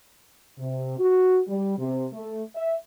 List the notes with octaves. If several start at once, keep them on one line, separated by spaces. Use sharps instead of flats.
C3
F#4
G3
C3
A3
E5